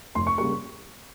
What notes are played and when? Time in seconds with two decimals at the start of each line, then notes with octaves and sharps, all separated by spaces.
0.15 F1 C6
0.27 C#6
0.38 C#3 G3 A#3 C#6